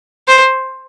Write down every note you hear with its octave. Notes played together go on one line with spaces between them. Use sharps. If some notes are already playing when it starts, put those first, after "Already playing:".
C5